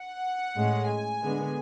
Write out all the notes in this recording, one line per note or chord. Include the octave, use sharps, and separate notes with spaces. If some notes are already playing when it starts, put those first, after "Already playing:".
Already playing: F#5
A2 G#3 C#4
G#5
D3 G#3 B3